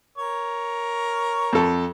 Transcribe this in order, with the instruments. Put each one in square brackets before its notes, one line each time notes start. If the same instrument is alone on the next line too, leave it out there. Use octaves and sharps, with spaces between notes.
[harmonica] A#4 C#5
[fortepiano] F2 A4